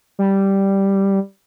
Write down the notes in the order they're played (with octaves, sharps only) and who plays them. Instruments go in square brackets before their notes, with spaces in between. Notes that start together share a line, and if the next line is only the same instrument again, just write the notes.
[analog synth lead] G3